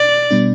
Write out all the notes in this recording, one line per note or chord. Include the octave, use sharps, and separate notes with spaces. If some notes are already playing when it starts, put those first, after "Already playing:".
Already playing: B2 D5
B2 G3 B3 D4